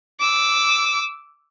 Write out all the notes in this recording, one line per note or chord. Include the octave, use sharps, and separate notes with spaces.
D6 E6